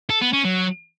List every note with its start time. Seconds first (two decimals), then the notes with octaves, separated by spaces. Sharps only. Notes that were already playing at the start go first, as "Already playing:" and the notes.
0.10 A4
0.21 B3
0.33 C#4
0.44 F#3